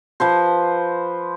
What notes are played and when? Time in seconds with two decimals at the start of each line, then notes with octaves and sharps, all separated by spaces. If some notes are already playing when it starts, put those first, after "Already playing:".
0.20 F3 B4 C5